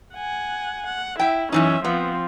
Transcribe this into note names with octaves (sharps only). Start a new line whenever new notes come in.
F#5 G#5
F#5
E4 E5 G5
F#2 E3 C#4 D#4 E5
F3 B3 C4